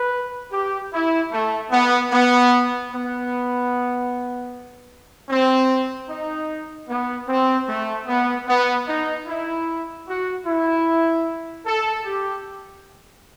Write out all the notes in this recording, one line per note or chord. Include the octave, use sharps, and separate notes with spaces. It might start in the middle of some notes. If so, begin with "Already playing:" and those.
Already playing: B4
G4
E4
A3
B3
B3
B3
C4
D#4
B3
C4
A3
B3
B3
D#4
E4
F#4
E4
A4
G4